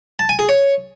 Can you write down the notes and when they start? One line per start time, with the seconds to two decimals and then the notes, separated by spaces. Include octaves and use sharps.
0.19 A5
0.29 G#5
0.39 G#4
0.49 C#5